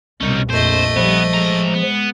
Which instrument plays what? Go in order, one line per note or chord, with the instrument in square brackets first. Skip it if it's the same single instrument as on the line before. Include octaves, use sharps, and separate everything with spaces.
[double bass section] C2 B2 [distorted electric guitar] C#4 D#4
[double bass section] A#1 F2 [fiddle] A3 D#5 [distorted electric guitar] C5
[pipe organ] F3 [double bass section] G3 [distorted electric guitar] B3
[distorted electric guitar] A2 A#5 [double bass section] G#3
[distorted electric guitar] B3